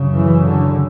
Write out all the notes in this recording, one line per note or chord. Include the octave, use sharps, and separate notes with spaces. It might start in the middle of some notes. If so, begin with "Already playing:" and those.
Already playing: F#2 C#3
E3
D3